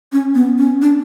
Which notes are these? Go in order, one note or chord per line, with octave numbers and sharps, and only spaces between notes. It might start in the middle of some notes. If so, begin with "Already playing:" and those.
C#4
B3
C#4
D4